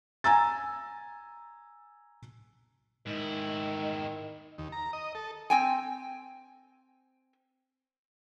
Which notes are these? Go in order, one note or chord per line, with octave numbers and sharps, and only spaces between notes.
G#5 A#5 E6 A6
G#2 D#3 E4 D#5
D#2
A#5
D#5
A4
C4 G5 G#5